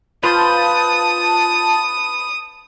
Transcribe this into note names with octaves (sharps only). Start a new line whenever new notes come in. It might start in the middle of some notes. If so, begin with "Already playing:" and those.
F4 B4 C5 G5 A5 D#6